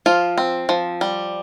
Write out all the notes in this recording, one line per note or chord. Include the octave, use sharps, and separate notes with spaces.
F3 F4
C4
F3
G3